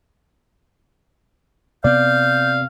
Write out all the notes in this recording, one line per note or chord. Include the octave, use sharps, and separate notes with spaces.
C3 B3 C4 D5 F5 G6